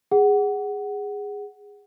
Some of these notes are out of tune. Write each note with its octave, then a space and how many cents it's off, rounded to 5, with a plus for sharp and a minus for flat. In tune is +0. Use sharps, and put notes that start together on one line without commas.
G#4 -15 F#5 +10